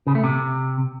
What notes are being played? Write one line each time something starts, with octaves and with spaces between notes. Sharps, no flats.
C#3
A3
C3